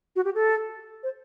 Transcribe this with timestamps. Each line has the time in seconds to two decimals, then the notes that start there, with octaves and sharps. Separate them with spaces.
0.16 F#4
0.25 G4
0.35 A4
1.03 C5